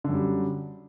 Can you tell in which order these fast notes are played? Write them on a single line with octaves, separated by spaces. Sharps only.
D3 F#2 G3